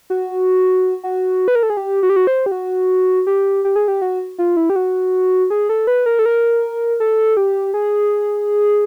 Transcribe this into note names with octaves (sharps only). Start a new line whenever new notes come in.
F#4
F#4
B4
A#4
A4
G#4
G4
F#4
G4
F#4
C5
G4
F#4
G4
G4
G#4
G4
F#4
F4
E4
G4
F#4
G#4
A4
B4
A#4
A4
A#4
A4
G4
G#4